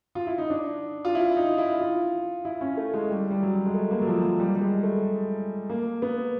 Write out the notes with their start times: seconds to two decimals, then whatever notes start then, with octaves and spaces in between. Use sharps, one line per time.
0.15 F4
0.27 E4
0.38 D#4
0.50 D4
1.05 F4
1.15 E4
1.36 D#4
1.58 E4
1.80 F4
2.45 E4
2.61 C#4
2.77 A3
2.94 G#3
3.10 G3
3.31 G3
3.42 F#3
3.66 G#3
3.74 A3
3.91 A#3
4.01 F#3
4.07 F3
4.23 F#3
4.40 G3
4.55 G3
4.61 G#3
4.83 A3
5.69 A#3
6.02 B3